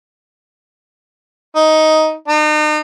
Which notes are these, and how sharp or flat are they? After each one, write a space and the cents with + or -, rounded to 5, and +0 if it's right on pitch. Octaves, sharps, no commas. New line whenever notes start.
D#4 +10
D#4 -40